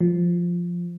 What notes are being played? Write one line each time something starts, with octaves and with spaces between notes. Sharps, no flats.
F3